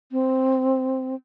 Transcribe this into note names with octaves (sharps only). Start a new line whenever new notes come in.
C4